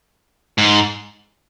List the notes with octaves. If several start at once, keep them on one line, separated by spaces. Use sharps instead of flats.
G#2